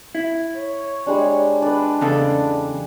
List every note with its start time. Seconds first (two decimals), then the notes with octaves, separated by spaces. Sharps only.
0.15 E4
0.55 C#5
1.07 G3 G#3 D4
1.62 D4 B4 D5
2.01 E2 C#3 A4